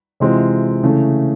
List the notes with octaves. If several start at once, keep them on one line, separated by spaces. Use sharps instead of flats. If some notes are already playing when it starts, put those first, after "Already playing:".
C3 E3 G#3 C4 F4
C#3 E3 A3